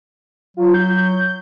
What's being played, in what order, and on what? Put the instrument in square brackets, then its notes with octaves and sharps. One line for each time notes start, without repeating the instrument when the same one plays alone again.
[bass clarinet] F#3 [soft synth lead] F4
[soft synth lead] G6